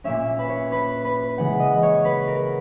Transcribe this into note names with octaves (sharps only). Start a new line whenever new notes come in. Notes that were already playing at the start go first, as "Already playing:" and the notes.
A#2 A#3 C#4 E5
B4
C#5
B4
B4
C#3 E3 G#3 F#5
D#5
C#5
B4
A#4